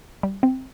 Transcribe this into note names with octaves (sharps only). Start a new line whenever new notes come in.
G3
C4